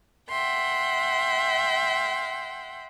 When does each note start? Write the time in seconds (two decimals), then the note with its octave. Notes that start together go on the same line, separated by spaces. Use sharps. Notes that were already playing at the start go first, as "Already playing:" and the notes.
0.31 E5 F#5 G5 C6